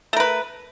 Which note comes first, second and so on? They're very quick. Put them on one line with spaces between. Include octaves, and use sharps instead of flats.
A3 A#4 B4